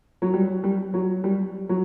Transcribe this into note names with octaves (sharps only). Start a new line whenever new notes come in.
F#3
G3
G3
F#3
G3
F#3